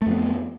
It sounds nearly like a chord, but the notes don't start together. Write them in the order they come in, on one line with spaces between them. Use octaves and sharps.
A3 F2 B3